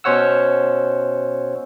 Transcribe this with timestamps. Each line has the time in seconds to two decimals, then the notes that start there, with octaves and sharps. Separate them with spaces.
0.04 B2 C#4 C5 C#5 F#5 E6